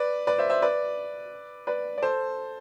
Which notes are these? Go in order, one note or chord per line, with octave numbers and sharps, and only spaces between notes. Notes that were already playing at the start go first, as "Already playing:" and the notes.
Already playing: B4 D5
B4 D5
C5 E5
C5 E5
B4 D5
B4 D5
D5
A4 C5